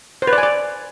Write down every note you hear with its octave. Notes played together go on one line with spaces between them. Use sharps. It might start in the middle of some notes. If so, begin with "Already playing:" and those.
C5
B4
D5
G#5
D5